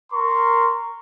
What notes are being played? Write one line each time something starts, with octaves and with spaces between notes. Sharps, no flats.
A#4 A#5 C6 C#6